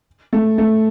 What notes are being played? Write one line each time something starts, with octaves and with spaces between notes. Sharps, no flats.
A3
A3